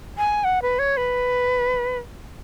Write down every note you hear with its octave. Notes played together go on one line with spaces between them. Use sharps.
G#5
F#5
B4
C#5
B4